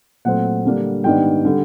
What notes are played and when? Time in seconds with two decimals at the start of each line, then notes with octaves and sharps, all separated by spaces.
0.25 A#2 F#3 A3 C4 F#5
0.65 D3 G3 A#3 D4
1.04 G#2 D#3 G3 B3 D4 G5
1.45 D3 G3